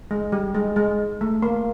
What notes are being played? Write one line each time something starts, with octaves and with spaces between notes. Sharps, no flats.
G#3
G3
G#3
G#3
A3
A#3